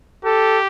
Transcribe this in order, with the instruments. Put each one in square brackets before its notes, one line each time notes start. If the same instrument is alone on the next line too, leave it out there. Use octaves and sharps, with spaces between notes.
[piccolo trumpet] G4 [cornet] A4